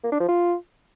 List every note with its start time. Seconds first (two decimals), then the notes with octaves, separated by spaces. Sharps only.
0.04 A#3
0.12 D4
0.20 F3
0.28 F4